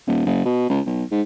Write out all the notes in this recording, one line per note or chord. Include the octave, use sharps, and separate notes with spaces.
D#1
F#1
B2
C#2
B1
G#2